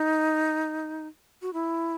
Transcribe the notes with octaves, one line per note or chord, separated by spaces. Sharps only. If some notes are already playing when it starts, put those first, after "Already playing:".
Already playing: D#4
F#4
E4